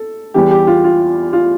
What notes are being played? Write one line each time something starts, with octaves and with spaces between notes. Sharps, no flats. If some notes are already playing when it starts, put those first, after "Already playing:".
Already playing: A4
E2 E3 G3 G4
G4
F4
F4
F4